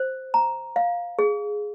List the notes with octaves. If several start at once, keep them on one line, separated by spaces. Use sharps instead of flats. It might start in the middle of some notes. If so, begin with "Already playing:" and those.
Already playing: C5
A#5
F5
G#4